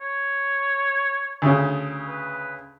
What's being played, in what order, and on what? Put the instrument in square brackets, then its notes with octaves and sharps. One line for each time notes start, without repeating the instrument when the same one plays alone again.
[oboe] C#5
[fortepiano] D2 C#3
[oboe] B4